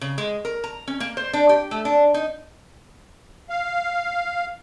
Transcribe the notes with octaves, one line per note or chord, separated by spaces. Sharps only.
C#3
G#3
A#4
A#5
C#4
A#3
C5
D4
G4
A3
D4
D#4
F5